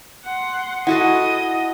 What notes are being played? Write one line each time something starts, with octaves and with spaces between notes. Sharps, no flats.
F#5 C6
E4 F#4 A4 D#5 F#5